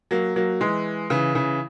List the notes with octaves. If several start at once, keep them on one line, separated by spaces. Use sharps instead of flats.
F#3 A#3
F#3 A#3
E3 G#3
C#3 E3
C#3 E3